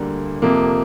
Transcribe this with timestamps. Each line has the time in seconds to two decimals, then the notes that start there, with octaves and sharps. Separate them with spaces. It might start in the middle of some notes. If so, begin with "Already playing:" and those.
Already playing: D2 D3 G3 A#3
0.42 F2 C3 F3 A#3